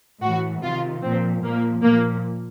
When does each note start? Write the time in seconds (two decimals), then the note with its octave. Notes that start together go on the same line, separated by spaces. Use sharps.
0.22 A2 E3 F#4
0.62 C3 D#3 F4
1.03 A#2 F3 C4
1.43 A#2 F3 A#3
1.83 A#2 F3 A#3